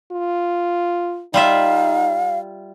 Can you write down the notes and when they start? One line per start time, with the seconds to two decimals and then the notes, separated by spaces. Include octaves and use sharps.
0.12 F4
1.34 G3 D#4 F4 E5 F5